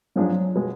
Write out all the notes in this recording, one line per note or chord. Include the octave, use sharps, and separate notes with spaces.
G#2 F3 F#3 G#3 D4
B2 G#3